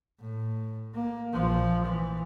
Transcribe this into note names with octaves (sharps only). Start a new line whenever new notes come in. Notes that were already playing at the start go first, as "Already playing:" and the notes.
A2
A#3
A#1 F3
E3